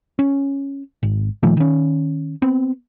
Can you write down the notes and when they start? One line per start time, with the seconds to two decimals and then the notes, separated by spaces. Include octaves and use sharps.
0.19 C#4
1.03 G#1
1.43 A#2 D#3 F3 A3
1.57 D#3 C#4
2.42 B3 C4